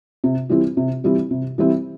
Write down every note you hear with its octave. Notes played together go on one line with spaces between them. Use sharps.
C3
E3 G3 C4 E4
C3
E3 G3 C4 E4
C3
E3 G3 C4 E4